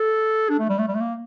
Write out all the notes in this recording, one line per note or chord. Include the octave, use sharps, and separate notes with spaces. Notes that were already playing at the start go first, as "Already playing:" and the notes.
Already playing: A4
D4
A3
G3
A3
G3
A3
A#3